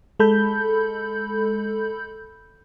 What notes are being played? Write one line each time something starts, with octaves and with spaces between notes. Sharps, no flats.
G#3 A4 B5 G6